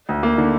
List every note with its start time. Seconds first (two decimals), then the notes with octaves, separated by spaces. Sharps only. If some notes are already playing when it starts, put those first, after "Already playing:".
0.09 D2
0.23 A#3
0.38 D3